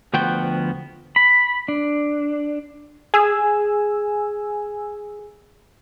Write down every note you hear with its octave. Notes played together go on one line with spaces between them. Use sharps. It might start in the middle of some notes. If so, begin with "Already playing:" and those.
D2 F3 B3 F#4 G5
B5
D4
G#4 G#5 E6